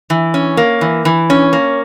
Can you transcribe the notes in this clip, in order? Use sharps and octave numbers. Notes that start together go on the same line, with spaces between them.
E3
C#4
A#3
E3
E3
C#4
A#3